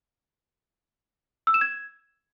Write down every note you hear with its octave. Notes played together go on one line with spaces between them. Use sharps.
E6
E7
G#6